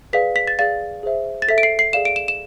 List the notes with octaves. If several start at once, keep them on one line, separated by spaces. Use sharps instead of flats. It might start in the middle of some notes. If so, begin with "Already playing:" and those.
G#4 B4 D5 F5 B6
B6
A6
G#4 D5 F5 A6
G#4 C5 E5
A6
A4 E5 B6
D7
C7
C7
G#4 D5 F5 E7
D7
E7
E7